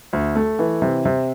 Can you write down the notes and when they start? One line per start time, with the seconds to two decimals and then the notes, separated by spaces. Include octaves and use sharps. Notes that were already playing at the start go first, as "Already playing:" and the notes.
0.13 D2
0.36 A3
0.59 E3
0.82 C3
1.05 C3